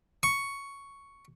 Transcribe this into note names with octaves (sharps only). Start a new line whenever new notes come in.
C#6